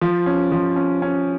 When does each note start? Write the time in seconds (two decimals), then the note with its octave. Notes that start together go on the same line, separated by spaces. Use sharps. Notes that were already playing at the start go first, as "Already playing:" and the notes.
0.01 F3
0.26 C#4
0.52 F3
0.76 C#4
1.02 C#4